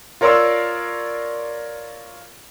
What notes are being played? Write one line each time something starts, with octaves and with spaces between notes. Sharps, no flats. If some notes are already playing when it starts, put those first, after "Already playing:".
F4 A#4 C#5 D5 C6 E6